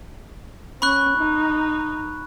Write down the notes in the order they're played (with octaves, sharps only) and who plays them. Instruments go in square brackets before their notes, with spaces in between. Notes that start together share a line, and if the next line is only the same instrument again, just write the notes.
[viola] C#4 [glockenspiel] B5 C#6 F#6
[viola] D#4